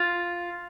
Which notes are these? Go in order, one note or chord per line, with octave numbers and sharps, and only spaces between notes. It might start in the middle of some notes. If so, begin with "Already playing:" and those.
Already playing: F4